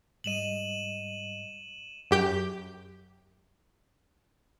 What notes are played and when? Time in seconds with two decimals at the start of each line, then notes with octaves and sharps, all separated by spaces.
0.24 G#2 G3 D#5 D#7 E7 F#7
2.11 F#2 G4 G6